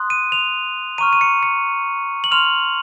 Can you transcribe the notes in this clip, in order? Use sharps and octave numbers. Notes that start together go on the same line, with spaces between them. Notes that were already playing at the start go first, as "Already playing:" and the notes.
Already playing: C6 D#6 F#6
D#7
F7
A#5 C#6 F6 D#7
D#7
C#7
C#7
F#7
C6 F6 F7